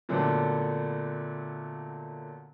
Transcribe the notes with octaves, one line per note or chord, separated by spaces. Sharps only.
A#2 D3 F#3 A3 B3 D4